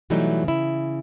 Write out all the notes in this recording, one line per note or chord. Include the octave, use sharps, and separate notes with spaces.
B2 E3 F#3 G3 A3 D#4
C#3 E4